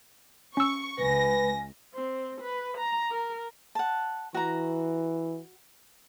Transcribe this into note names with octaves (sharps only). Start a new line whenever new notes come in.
C#4 C#6 E6
C#2 B4 G#5 A#6
C4
B4
A#5
A#4
F#5 A5
E3 F#4 A#5